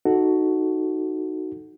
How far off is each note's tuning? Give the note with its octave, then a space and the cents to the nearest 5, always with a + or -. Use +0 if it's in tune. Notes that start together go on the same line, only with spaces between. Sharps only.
D#4 +0 F#4 +0 A4 +0